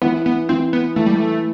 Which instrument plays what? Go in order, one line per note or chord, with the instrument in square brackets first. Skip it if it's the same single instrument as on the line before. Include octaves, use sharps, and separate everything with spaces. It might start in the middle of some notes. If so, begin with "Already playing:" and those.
[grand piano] E3 [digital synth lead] B3
[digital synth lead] B3
[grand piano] E3 [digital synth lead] C4
[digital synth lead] B3
[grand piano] E3 [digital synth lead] A3
[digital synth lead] G3
A3